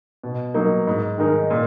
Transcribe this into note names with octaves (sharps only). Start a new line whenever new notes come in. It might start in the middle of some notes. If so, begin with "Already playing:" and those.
B2
F#3 A#3 D#4
G#2
D#3 G#3 D#4 A#4
A#2